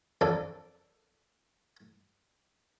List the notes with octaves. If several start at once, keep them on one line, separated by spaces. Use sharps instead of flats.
F2 D4 A4